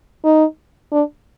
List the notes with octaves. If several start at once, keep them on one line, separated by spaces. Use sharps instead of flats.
D#4
D4